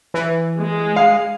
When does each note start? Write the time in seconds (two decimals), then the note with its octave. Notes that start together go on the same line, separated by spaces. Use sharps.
0.14 E3
0.59 G#3
0.96 F5